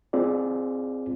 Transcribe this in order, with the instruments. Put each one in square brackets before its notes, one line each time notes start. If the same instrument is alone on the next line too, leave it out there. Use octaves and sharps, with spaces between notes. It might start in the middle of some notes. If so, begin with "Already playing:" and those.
[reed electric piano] C4 F4 G#4 D5